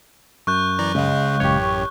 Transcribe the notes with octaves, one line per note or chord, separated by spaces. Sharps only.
F#2 C#6 F#6 G6
E3 D5 A#5
C#2 C#3 G#3
A1 F#2 G4 C#5